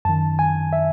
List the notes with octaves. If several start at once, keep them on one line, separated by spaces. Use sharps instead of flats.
F#2 D#3 A5
G#5
E5